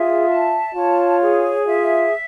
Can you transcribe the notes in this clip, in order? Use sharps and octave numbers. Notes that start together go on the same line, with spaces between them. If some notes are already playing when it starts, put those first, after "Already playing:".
Already playing: F4 G#4 E5
A5
F4 C#5
G#4
F4 E5